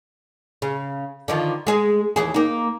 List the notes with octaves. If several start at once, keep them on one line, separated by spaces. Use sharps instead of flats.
C#3
D3 D#3 F3
G#3 G#4
D#2 E3 G#4
A#3 D#4